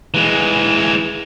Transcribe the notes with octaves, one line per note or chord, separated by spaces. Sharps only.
E3 G#3